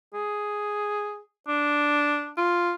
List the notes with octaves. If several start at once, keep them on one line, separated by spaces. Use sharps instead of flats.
G#4
D4
F4